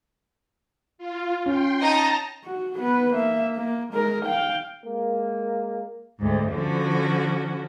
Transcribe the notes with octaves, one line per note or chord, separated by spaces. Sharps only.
F4
C#4 G5 C6
D#4 D#5 A5 A#5 A#6
F#4
B3 B4
A#3 E5
A#3
G#3 A#4
F5 G5
G#3 A#3
D2 G#2
D3 F3 C#4 F#4